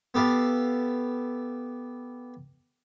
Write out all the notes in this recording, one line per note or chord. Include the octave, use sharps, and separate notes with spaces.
B3 G4 A4 F5